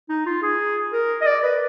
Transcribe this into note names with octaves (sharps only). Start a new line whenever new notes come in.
D#4
F4
G#4
A#4
D#5
D5
B4